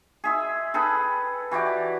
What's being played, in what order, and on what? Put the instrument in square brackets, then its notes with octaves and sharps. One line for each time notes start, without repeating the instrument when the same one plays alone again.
[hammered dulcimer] G#4 E5 C6
G#4 A4 B4 G5
E3 F#4 G4 D5